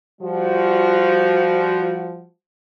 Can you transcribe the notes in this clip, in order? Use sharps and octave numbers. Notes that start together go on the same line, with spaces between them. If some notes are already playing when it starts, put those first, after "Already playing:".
F3 G3 F#4